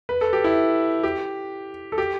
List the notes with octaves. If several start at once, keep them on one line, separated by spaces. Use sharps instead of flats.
B4
A4
G4
E4
G4
A4
G4